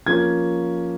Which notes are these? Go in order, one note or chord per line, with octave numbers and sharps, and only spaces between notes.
F3 A#3 C#4 G#6